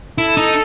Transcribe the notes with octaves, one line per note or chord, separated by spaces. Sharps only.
E4 A4
D#4